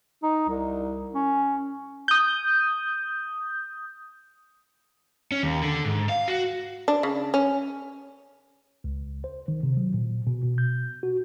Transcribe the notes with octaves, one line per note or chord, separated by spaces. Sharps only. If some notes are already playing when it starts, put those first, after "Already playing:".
D#4
C2
C#4
D#6 G6
C#4
D#2
D3
G#2
F5
F#4
D4
C#3
C#4
C#2
C5
D#3
C3
F#3
A#2
B2
B2
G6
F#4